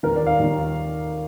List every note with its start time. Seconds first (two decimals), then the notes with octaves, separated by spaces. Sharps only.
0.03 D#2 D#3 A#4
0.16 D5
0.26 F5
0.40 D#2 D#3